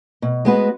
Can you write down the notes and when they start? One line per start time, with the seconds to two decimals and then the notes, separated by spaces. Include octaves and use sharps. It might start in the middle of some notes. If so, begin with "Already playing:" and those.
0.22 B2
0.45 G#3 B3 F#4 B4